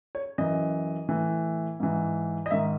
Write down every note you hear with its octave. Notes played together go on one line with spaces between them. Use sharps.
C#5
F#2 E3 D#5
A2 E3
G#2 E3
D#5
G#2 D#3 E5